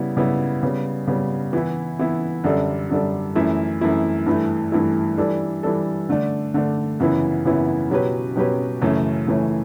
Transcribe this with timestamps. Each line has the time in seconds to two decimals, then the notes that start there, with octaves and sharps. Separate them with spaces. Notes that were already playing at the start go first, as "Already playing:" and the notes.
Already playing: C#3 G3 B3 E4
0.17 C#3 G3 B3 E4
0.63 C#3 G3 B3
1.08 C#3 G3 B3
1.53 E3 B3 E4
1.99 E3 B3 E4
2.44 F#2 D3 G3 D4 A4
2.90 F#2 D3 G3 D4 A4
3.36 F#2 E3 A3 E4
3.81 F#2 E3 A3 E4
4.26 G2 E3 A3 E4
4.72 G2 E3 A3 E4
5.17 E3 G3 D4 A4
5.63 E3 G3 D4 A4
6.09 D3 A3 D4
6.54 D3 A3 D4
7.00 F#2 C#3 E3 B3 E4
7.45 F#2 C#3 E3 B3 E4
7.90 B2 F#3 C#4 G4 B4
8.36 B2 F#3 C#4 G4 B4
8.82 F#2 C#3 E3 A3 C#4
9.27 F#2 C#3 E3 A3 C#4